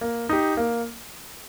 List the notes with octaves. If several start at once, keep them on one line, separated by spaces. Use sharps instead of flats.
A#3
D#4 G4
A#3